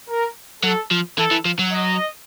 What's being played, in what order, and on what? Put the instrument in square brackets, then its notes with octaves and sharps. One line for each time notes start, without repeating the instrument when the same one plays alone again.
[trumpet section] A#4
[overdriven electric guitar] F#3 [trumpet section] A4
[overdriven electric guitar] F3
[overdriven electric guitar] E3 [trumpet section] A4
[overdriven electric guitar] E3
F3
F#3
[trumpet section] D#5